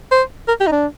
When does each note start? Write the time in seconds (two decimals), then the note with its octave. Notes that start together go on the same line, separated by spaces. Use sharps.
0.12 C5
0.48 A#4
0.60 G4
0.67 D#4
0.72 D4